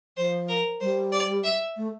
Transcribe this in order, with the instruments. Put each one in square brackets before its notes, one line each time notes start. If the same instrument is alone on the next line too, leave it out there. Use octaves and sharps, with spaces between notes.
[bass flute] F3 [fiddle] C5
[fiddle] A#4
[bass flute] G3 [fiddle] C5
[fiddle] D5
E5
[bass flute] A3